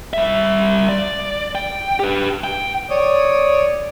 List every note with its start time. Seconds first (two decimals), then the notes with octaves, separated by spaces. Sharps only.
0.13 G3 E5
0.89 D5
1.55 G5
2.00 G4 B4
2.44 G5
2.90 C#5 D5 D#6